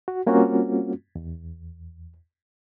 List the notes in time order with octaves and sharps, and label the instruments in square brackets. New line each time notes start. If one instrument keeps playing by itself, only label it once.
[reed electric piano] F#4
G3 A#3 C4 C#4 F4 F#4
E2